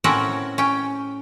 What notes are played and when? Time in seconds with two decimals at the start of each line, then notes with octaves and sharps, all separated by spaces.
0.04 A2 C4 C#4 F#4 A#4
0.58 C#4 G5